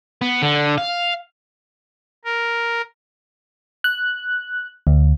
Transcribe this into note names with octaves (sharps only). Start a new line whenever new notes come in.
B3
D3
F5
A#4
F#6
D2